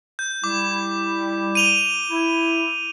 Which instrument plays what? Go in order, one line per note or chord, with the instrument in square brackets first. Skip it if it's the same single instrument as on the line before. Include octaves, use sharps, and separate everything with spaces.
[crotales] G6
[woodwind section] G3 E4 [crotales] D6
[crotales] D#7 F7 G7
[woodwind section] E4